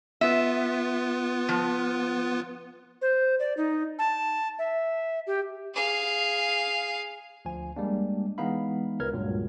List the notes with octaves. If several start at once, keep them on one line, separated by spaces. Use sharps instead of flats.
B3 F4 B4 E5
F3
C5
D5
D#4
A5
E5
G4
G#4 F5
D2 F3 G#5
G3 G#3 A#3 D4
E3 G#3 B3 D#4 F5 B5
C#2 A#4 B4 F6 G#6
C#2 G2 A#2 F#3